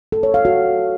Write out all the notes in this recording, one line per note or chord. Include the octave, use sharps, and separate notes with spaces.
A4
C#5
F5
F#4